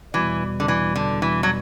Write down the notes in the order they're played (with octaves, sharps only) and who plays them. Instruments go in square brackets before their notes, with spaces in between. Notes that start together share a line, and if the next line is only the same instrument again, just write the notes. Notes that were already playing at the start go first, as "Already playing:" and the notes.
[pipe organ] E2 B2 G3 [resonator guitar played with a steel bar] E3
[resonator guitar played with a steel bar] D3
E3
D3
E3
F#3